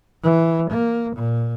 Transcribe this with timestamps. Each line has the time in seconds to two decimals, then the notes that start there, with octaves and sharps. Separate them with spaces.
0.23 E3
0.71 A#3
1.16 A#2